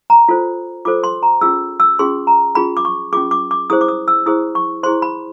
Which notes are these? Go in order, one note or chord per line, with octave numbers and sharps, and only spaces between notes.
A#5
F4 A4 C5
F4 A4 C5 D6
C6
A#5
C#4 F4 G#4 E6
E6
C#4 F4 G#4 C6
A#5
C#4 F4 G#4 B5
D6
C#6
C#4 F4 G#4 D6
D6
D6
E4 G#4 C5 D#6
D6
D#6
E6
E4 G#4 C5 D#6
C#6
E4 G#4 C5 C6
B5